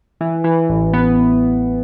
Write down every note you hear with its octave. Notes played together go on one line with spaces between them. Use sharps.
E3
E3
A1
B3